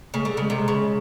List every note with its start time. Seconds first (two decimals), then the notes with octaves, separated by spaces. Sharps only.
0.14 C#3 A3
0.21 G#3
0.25 D3 G3
0.37 C#3 G#3
0.50 C3
0.68 C#3